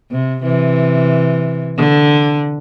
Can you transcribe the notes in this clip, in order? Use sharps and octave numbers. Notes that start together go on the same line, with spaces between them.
C3
C3 E3
D3